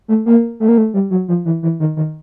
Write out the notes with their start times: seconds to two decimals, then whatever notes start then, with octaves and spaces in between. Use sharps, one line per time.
0.08 A3
0.26 A#3
0.60 A3
0.69 A#3
0.78 A3
0.94 G3
1.10 F#3
1.28 F3
1.45 E3
1.63 E3
1.80 D#3
1.96 D#3